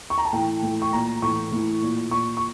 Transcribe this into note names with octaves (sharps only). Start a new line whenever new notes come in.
C#6
A#5
A5
A2 E3 G5
A2 E3
C#6
A#2 A#5
A2 E3 C#6
A2 E3
A#2
A#2 C#6
C#6